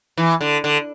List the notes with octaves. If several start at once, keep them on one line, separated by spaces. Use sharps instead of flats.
E3
D3
D3